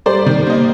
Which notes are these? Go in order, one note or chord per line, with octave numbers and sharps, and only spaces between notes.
G3 C5 D5
D#3
A#3 D#5